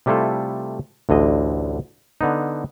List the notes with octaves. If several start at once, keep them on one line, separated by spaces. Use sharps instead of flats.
C3 G3 A3 E4 F4 A4
A1 D2 D3 D#5
D3 B3 D#4